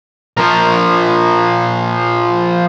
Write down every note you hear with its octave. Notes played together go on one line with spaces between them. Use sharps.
F3 A#4